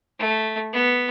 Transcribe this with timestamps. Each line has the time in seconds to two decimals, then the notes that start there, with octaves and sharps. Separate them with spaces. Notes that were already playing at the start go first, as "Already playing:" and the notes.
0.19 A3
0.73 B3